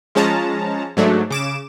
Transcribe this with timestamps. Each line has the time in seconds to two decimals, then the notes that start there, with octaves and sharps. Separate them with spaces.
0.15 F3 G#3 C#4 A5 A#5
0.97 G#2 F#3 A3 D4
1.30 C#3 D6 E7